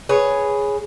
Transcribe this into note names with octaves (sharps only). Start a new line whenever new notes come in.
G#4 B4 C#5